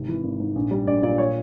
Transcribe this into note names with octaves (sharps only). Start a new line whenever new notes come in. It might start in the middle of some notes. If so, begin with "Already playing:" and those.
Already playing: G#1 C3
E3
G#1
G#2
A#1
G3
A#1 D5
A#2 D5
C#5